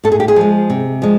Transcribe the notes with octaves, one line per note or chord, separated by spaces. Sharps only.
A2 A4
G#4
G4
G#4
F3 G#3
C3
F3 G#3